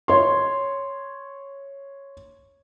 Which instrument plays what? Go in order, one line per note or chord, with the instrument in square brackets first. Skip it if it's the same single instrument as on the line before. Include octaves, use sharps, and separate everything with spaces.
[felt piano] C#5 C6